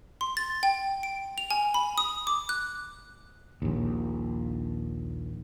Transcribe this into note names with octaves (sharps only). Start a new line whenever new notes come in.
C6
A6
G5
D7
F7
G#5
B5
D#6
D6
F#6
A#1 D#2